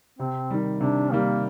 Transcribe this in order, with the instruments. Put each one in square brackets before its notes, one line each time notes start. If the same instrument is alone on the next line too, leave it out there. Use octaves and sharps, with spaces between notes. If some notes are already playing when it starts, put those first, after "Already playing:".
[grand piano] C3 [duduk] C4
[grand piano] D#3 G3
[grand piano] C3 [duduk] D4
[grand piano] D#3 G3 [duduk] A#3